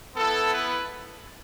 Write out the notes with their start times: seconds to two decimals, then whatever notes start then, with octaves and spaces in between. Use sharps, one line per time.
0.16 B3 E4 A4
0.51 B4